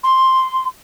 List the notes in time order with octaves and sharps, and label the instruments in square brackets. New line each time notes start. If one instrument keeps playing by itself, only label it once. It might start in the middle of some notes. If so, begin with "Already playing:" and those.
[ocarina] C6